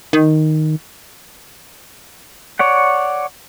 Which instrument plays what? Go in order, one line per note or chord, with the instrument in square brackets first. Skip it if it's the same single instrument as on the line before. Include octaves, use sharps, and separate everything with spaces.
[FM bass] D#3
[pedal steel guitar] C#5 D5 F#5